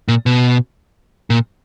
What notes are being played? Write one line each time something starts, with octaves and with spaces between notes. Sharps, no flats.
A#2
B2
A#2